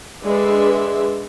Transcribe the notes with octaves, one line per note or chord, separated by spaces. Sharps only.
D3 G#3 B4 D5 E5 C6